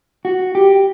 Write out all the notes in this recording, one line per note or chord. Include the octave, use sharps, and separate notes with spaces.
F#4
G4